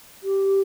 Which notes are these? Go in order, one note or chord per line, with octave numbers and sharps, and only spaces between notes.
G4